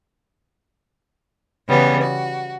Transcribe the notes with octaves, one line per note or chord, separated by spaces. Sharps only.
C#3 E3 G3 B3
F#4